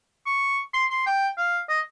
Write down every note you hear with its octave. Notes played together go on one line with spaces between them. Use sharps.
C#6
C6
C6
G5
F5
D#5